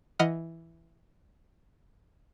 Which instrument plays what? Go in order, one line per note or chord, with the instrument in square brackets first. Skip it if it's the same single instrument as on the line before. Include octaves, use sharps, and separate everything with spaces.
[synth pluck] E3 D#5 F#5 B5 F6